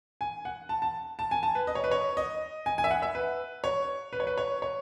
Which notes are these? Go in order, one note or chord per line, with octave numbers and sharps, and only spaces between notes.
G#5
F#5
A5
A5
A5
G#5
A5
B4
D#5
C#5
B4
C#5
D#5
G#5
G#5
E5
F#5
E5
B4
C#5
B4
C#5
B4
C#5
C#5